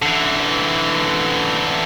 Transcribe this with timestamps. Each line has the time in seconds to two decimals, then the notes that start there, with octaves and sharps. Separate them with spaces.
0.02 D3 E3